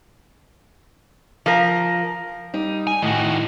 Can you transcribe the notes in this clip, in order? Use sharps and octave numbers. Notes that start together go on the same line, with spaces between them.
F3 A#4
G3 D#4
G#5
A2 D#3 F#4